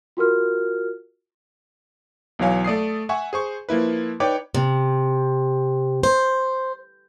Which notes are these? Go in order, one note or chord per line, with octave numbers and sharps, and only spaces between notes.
F4 F#4 A#4 F6
B1 E3 F#3 C#5 F5 G#5
A3 D5 D#6 C7
E5 F#5 G#5 C#6
G#4 C5 C#6
F3 A#3 E4 B4
D#4 B4 C#5 D5 G5 D6
C3
C5